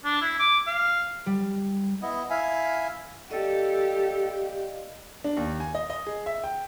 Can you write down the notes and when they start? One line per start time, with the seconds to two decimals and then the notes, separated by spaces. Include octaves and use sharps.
0.05 D4
0.21 E4
0.39 D6
0.67 F5
1.26 G3
2.02 B3 E4 D#5
2.30 E4 E5 F5 G#5
3.31 G4 A4 D5 D#5 F5
5.24 D4
5.37 D#2
5.60 G#5
5.75 D#5
5.90 D#5
6.07 G#4
6.26 E5
6.44 G5